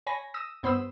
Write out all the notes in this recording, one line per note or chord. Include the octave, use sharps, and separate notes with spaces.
C#5 G#5 B5 A#6
D#6 E6 A#6
G2 B3 C5 B5 D#6 E6